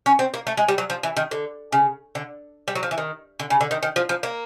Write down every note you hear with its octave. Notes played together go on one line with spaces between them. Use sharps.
C#4
C4
A#3
A3
G#3
G3
F#3
F3
E3
D#3
D3
C#3
D3
G3
F#3
F3
E3
D#3
D3
C#3
D3
D#3
D#3
F3
F3
A#3